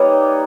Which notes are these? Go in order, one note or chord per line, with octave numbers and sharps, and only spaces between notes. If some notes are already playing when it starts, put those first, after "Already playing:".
Already playing: G3 A#3 D#4 B4 C#5 D#5